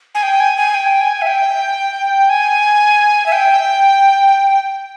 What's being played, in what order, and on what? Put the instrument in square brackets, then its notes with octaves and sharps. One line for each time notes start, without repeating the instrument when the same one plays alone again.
[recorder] G#5
G5
G#5
G#5
G5
G#5
E5
G5
G#5
E5
G5